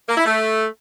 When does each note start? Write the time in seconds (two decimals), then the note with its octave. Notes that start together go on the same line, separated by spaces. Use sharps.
0.09 A#3
0.17 E4
0.26 A3